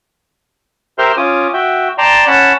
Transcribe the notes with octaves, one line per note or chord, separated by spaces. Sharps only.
G4 A#4 C5 E5 C6 F6
C#4 F4 D6 D#6
F#4 E5 G5
D5 G5 A5 A#5 C6
C#4 F#5 A5 B5